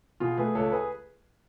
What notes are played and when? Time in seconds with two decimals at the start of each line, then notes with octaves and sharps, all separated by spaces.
0.20 B2 F4 G#4
0.38 A3 G#4 B4
0.55 C#2 A4 C#5
0.72 G#4 B4